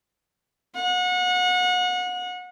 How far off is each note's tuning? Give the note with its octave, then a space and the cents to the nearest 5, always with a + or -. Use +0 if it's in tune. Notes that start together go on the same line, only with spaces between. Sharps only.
F#5 -30